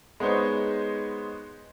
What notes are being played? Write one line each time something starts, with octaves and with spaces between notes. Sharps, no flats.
G#3 B3 D#4 C5 C#5